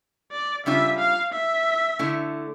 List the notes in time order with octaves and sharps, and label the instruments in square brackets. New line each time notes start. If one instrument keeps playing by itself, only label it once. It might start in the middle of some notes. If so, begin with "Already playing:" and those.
[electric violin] D5
[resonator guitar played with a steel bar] C#3 G3 D4 F4 [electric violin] E5
[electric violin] F5
E5
[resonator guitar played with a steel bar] D3 A3 E4